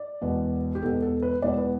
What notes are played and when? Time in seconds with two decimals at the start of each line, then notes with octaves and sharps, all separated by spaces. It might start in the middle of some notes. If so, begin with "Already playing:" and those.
Already playing: D5
0.21 E1 E2 B2 B3
0.75 G4
0.82 E1 E2 B2 B3 A4
1.02 A4
1.22 B4
1.42 E1 E2 B2 B3 D5
1.58 B4